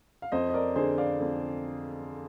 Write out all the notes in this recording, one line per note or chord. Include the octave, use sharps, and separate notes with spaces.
F5
F2 C5 D#5
D#5
A#4 D5
D3 G#4 C5
D5 F5
F2